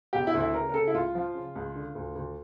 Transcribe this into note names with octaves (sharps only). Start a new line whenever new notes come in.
E1 G4
E4
D2
E4
C#3 A#4
A#4
C#3 A4
E4
C#2 F4
F3
C#3
C#2
D3
D2
D2